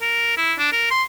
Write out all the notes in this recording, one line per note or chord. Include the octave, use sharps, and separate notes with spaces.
A#4
E4
D4
A#4
C6